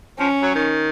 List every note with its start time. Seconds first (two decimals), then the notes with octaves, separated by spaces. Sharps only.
0.19 F3 C#4
0.43 F#3
0.55 D#3